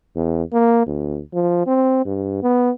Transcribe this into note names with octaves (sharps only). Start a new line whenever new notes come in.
E2
A#3
D2
F3
C4
G2
B3